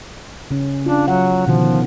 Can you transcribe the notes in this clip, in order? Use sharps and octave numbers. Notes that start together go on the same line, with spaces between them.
C#3 C#4
D4 F4
F#3 F#5
B2 D3 D#3 F3